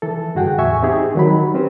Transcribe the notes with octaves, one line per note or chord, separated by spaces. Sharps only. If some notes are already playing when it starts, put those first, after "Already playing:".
E3 A4
G2 D3 F#4 G#4 F#5 G5
E2 A2 E5 G#5 C#6
C4 D#4 G4 G#4
D#3 F#3 B5
C4 C#4 G4 B4 C5